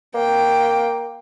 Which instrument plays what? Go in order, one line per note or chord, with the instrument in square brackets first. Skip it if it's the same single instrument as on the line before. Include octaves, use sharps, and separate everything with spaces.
[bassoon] A#3 [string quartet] G5